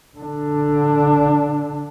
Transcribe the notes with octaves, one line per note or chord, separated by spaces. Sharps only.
D3 D4